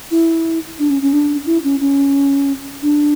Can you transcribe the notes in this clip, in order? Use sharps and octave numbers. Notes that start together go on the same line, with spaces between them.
E4
D4
C#4
C#4
D4
E4
C#4
C#4
D4